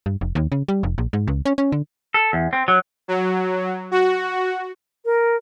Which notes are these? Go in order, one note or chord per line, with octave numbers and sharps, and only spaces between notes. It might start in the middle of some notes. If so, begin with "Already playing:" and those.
G2
F1
D#2
C#3
G3
F1
A#1
G#2
C#2
C#4
C#4
D3
A4
E2
C4
F#3
F#3
F#4
A#4